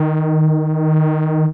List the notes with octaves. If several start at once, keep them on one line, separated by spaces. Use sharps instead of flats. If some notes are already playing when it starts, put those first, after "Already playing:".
Already playing: D#3